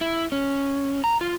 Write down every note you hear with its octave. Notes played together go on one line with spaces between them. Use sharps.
E4
C#4
A#5
F4